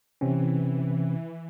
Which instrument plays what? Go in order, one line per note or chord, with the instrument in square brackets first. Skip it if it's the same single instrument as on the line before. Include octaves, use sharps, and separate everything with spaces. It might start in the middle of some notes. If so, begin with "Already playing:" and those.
[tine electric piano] C3 C4 C#4 [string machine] E3